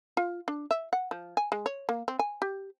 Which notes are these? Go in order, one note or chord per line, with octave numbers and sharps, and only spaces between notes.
F4
D4
E5
F#5
F3
G#5
G#3
C#5
A#3
C4
G#5
G4